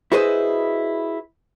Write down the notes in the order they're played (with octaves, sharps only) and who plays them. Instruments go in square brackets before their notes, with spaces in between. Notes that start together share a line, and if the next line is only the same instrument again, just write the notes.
[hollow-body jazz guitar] E4 F#4 G#4 B4 C5 D#5